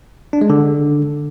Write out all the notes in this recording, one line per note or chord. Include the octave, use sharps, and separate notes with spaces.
D4
G#3
D3